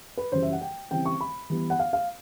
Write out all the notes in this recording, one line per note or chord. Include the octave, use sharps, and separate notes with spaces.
B4
F#2 C#3 E3 G3 C5
E5
F#5
G5
C#3 E3 G3 C4 E4 G5
C#6
B5
E3 G3 B3
F#5
F5
F5